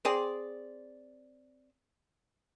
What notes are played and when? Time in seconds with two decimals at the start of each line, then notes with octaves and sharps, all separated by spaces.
0.05 C4 G#4 D5